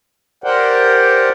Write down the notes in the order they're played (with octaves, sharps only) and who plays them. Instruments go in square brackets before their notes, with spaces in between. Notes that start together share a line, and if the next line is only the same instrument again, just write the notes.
[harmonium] G4 A#4 C5 D5 F#5 G5